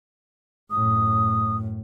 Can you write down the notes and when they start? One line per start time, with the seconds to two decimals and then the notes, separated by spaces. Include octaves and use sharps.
0.71 F#2 A2 D#6